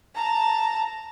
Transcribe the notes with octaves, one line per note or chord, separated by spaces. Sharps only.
A5 A#5